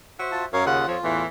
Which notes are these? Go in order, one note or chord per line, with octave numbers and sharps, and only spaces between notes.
F#4 C5 E5
F4 A5
F#2 A#4 C#5 F5
D#2 C#3 F4 F#5
F2 F3 C#5
E2 A2 E3